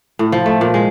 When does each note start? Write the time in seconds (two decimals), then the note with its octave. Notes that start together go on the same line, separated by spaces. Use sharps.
0.19 A2
0.32 F3
0.46 A3
0.61 A#2
0.74 G#3